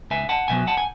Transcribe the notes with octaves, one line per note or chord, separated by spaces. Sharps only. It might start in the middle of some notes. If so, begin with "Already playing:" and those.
C#2 E5 G#5
F#5 A5
B2 F#3 B3 E5 G#5
F#5 A5
G#5